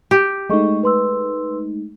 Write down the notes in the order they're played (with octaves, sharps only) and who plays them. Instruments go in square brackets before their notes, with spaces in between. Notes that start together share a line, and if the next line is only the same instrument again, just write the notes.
[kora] G4
[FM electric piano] G#3 A3 D#4 [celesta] D#5 C#6
[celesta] B4 C6 E6